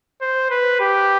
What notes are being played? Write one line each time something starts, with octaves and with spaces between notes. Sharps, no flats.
C5
B4
G4